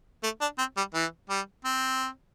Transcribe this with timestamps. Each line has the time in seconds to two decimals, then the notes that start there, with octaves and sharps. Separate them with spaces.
0.24 A3
0.41 D4
0.59 C4
0.77 G3
0.94 E3
1.30 G3
1.65 C4